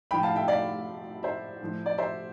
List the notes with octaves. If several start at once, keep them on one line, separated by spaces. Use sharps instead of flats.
A2 F3 G5 B5
F5 A5
E5 G5
D5 F5
C5 E5
A2 F3
D5
C5 E5